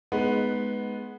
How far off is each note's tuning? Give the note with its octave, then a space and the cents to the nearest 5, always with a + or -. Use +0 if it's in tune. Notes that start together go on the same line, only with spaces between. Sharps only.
G#3 +20 B3 +0 D#4 +0